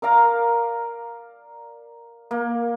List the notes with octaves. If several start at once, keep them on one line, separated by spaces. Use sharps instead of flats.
A#4 D5 F5 A#5
A#3